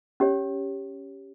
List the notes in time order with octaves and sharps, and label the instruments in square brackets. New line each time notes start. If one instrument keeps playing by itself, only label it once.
[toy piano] C#4 G4 C#5